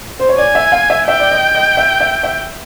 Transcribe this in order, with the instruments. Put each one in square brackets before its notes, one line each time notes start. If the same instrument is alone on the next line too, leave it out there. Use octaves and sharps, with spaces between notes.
[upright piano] C5
C#5
[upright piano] D5 [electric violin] G#5
[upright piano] E5
F5
E5
[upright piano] E5 [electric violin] G5
[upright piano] D5
D#5
D#5
E5
E5
E5